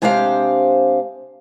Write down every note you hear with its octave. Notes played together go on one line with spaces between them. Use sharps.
C3 G#3 D4 G4 C5 F5